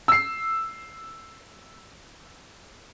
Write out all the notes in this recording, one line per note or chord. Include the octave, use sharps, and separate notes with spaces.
E6 C7